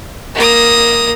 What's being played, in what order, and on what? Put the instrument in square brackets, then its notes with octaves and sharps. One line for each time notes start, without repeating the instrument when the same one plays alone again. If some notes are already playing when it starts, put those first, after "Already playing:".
[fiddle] A#3 D#6